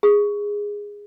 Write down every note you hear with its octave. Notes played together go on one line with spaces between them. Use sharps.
G#4